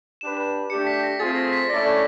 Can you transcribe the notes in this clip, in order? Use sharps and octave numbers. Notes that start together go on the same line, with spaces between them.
D4 G4 B4 E7
E7
A3 D4 G4 C#7
B6
A#6
A3 C4 F4 G#4 A6
A#6
B6
A3 C#4 E4 A4 D5 A#6